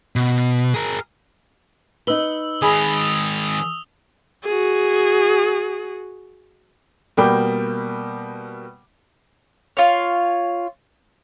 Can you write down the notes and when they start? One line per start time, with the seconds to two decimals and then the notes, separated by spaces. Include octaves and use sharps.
0.16 B2
0.74 G#4 A#4
2.07 D#4 B4 E6 F#7 G7
2.62 D#3 G#3 G#4 B5 D#6
4.44 F#4 G#4
7.17 B2 G3 A#3 G5 B5 D6
9.77 F4 C#5